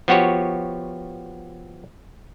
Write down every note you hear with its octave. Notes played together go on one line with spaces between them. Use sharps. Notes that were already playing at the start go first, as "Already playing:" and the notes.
F3 B3 F#4 G4 C#5